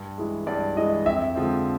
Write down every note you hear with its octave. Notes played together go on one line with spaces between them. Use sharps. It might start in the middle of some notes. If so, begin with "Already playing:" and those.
Already playing: G2
E3 G#3
G2 D5
E3 G#3 D#5
F2 E5
D3 F3 G#3 C4